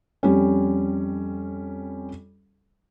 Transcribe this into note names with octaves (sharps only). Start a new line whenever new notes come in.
F2 G3 C#4